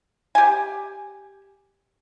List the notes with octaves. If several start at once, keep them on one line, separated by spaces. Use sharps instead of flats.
G4 G#5